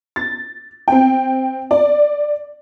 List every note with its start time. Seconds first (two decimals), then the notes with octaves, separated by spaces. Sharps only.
0.16 A6
0.88 C4 G5
1.71 D5